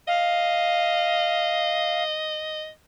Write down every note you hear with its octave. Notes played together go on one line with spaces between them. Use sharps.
D#5 F5